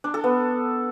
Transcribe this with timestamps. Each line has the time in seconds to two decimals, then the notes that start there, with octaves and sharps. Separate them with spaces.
0.04 D4
0.14 A4
0.24 B3